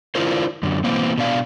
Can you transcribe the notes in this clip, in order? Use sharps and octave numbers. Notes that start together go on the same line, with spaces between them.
D4 E4 F4 A#4 C5
F#2 D3
B2 E3 A#3 C4
B2 D4 F5